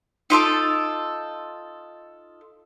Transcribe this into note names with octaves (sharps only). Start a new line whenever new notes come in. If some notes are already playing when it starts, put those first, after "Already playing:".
D#4 F4 A4 D6